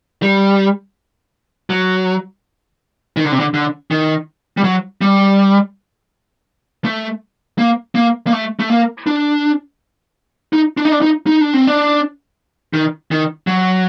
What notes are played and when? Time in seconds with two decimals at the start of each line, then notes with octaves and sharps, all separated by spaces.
0.22 G3
1.70 F#3
3.17 D#3
3.24 D3
3.32 C3
3.40 D3
3.54 D3
3.91 D#3
4.57 G3
4.64 F#3
5.02 G3
6.85 A3
7.58 A#3
7.95 A#3
8.27 A#3
8.33 A3
8.60 A3
8.70 A#3
9.07 D4
10.53 D#4
10.77 D4
10.85 D#4
10.92 D4
11.02 D#4
11.27 D#4
11.41 D4
11.53 C4
11.67 D4
12.73 D#3
13.11 D#3
13.47 F#3